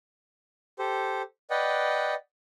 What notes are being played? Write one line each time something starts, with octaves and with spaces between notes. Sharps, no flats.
G4 A4 C5
B4 D5 D#5 F#5 G5